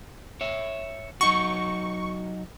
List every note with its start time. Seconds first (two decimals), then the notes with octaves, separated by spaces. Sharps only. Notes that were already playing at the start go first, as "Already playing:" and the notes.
0.41 C#5 E5
1.21 F#3 D#4 F#4 C#6